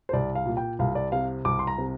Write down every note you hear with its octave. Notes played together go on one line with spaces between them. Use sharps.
C5
C2 D5
F5
A#2
G5
C2 F5
D5
C3 F5
C2 D6
C6
A#5
C3